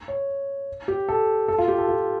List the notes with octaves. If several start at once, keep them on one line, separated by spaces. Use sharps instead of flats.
C#5
G4
A4
A4
F4
G4
A4
F4